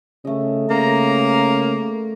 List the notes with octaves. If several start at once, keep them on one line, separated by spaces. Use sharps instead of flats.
C#3 A3 D#5
C#3 A#3 A#5